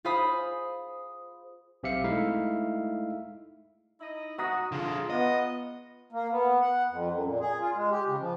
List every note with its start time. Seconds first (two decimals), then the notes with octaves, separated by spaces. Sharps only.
0.05 F4 G#4 C5 F5 B5 D#6
1.83 B1 C4 G4 E5 F5 C#7
2.04 G#3 A3 D#4 E4 E5 F5
4.00 D#4 E4 D#5
4.38 F#4 A#5 D#6 A#6
4.72 D3 F4 G#4
5.10 B3 D#5
6.12 A#3
6.30 B3
6.61 F#5
6.89 F2
7.12 F#2
7.25 A#2
7.40 G#4
7.60 F4
7.75 G#3
7.91 G4
8.07 C#3
8.19 F3